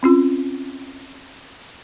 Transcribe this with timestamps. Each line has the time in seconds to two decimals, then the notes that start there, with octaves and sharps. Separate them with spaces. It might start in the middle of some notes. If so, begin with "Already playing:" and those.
0.03 C4 C#4 F4